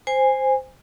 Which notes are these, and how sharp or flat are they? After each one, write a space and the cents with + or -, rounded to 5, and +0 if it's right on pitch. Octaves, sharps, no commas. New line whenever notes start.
C5 +0 G#5 -15